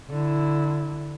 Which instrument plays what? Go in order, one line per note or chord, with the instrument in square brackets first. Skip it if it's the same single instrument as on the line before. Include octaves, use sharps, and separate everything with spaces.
[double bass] D3 E4